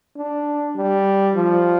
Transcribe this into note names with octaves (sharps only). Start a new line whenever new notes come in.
D4
G3
F3